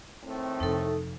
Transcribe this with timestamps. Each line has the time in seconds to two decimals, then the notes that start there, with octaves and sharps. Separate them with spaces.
0.23 A2 D#3 A3 C4
0.60 F2 C3 D#4 A4